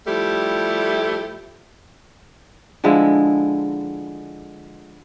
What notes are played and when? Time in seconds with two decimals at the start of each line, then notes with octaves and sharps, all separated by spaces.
0.07 F3 G3 A3 E4 G4
2.84 D3 F3 G#3 E4